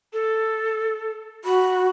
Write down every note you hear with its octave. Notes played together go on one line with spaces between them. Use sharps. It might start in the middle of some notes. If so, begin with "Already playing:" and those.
A4
F#4 B5